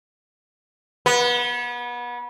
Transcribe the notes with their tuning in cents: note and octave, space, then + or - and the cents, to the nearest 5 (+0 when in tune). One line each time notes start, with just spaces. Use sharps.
B3 -30